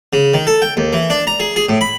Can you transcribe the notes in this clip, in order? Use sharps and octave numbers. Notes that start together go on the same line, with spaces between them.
C#3
D#3
A4
G5
D#2
E3
D4
A#5
G#4
G#4
A2
B5